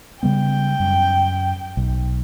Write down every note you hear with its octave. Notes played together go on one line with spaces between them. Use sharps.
C#3 G3 B3 G5
F#2
B1